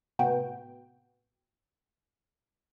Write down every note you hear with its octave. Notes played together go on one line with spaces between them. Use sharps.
A2 C3 B3 F#4 G5